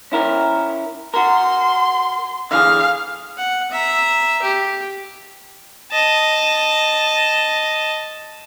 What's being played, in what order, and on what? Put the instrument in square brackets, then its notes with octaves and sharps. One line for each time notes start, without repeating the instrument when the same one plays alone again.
[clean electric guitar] C#4 E4 A#4
[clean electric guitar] F#4 A#4 [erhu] C6
[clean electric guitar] D3 E3 G#4 [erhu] F5
[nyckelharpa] F#5
E5 A#5
G4
[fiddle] D#5 A5